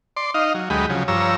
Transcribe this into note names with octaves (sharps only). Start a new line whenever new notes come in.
D5 C6
D#4 D#5 F5
F#3
D2 F#3 G#3 G4 D#5 B5
C#3 F3 F#3
G2 F3 C#5 A#5 E6